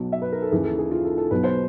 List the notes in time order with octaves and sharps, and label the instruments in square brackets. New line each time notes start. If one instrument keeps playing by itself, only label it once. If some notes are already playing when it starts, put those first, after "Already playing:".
Already playing: [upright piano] B1 B2 F#3
E5
B4
A#4
A4
D#2 C#3 E3 G#4
A4
G#4
F4
A4
A4
B1 B2 F#3 B4
C5